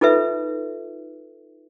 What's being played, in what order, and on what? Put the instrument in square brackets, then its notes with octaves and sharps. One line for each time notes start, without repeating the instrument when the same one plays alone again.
[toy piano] D#4 F4 A4 B4 E5